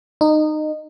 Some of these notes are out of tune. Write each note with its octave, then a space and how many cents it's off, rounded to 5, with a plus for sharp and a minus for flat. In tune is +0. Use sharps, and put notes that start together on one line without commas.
D#4 -20